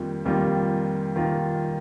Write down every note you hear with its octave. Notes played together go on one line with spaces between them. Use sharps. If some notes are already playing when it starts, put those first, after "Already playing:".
Already playing: F2 D#3 G3 A#3 F4
F2 D#3 G3 A#3 F4
D#3 G3 A#3 F4